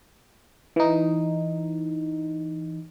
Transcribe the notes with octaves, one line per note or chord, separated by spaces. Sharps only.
E3 D#4